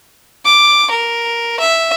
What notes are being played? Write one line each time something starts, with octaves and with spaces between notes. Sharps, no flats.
D6
A#4
E5